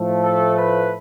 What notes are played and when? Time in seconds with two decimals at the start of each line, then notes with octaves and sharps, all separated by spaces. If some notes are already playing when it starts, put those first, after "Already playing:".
Already playing: A2 F3 A3
0.23 A4
0.57 B4